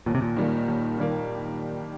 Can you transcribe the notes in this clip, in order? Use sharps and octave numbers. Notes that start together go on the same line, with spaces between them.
D#2 A#2
C3
A#2
D#3 G3 A#3
D#2
D#3 G3 A#3